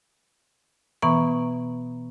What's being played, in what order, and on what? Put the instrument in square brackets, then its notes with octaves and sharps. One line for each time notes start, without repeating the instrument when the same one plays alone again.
[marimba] B2 E3 B3 A#5 C#6